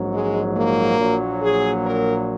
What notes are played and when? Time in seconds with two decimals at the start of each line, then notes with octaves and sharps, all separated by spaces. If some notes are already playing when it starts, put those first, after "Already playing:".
Already playing: A#1 G#2 F#3
0.12 G#3
0.55 A#3
0.98 A#1 A#2 F#3
1.41 G#4
1.85 A#4